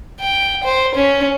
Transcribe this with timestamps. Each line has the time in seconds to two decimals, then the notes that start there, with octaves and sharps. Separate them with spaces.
0.20 G5
0.64 C5
0.96 C#4